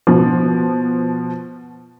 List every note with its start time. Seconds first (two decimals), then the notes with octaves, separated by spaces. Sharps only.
0.07 B2 F3